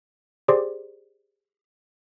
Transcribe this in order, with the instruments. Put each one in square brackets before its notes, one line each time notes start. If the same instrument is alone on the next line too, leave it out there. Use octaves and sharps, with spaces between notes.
[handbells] G4 G#4 C5 D5 C6 D6